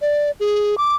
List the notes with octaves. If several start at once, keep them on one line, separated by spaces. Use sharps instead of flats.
D5
G#4
D6